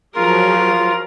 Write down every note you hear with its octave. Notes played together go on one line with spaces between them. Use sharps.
F3 F#3 F4 G#4 A#4